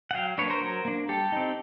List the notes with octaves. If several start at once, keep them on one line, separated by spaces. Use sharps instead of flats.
F#5
F#3 F5 G5
A#3 D4 B4 C#5
A#4 C5
F#3
A#3 D4
G3 G4 A4
C4 D#4